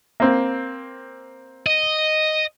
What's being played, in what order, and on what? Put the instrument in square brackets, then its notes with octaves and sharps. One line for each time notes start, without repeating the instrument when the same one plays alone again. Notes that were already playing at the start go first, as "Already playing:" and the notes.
[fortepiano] A#3 C4
[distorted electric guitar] D#5